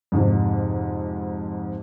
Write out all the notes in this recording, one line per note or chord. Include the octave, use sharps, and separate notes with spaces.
F2 G#2 C3